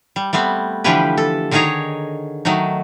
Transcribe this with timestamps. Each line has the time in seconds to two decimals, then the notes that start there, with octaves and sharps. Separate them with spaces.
0.16 G3
0.33 G3 A3 B3 C4
0.84 D3 E3 F3 G3 G4 B4
1.17 A4
1.51 D3 D#3 D#4 G#4 C#5 A#5
2.45 D#3 F#3 A3 D#4